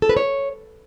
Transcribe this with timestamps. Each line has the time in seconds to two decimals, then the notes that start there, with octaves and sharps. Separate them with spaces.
0.02 A4
0.09 B4
0.17 C#5